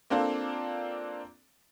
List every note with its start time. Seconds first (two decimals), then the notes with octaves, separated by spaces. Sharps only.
0.10 A#3 C4 D4 F4 A4